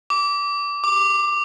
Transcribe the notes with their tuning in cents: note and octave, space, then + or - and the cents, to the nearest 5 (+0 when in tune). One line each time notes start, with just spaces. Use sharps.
D6 -20
D6 +15